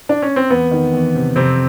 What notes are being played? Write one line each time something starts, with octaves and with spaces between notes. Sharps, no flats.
D4
C#4
C4
E2 B3
D#3
E2
C3
F2 C3 C4